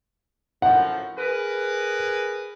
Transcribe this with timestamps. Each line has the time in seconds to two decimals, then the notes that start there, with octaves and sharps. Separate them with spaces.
0.62 F#2 A2 F3 F#5
1.19 G#4 A#4 B4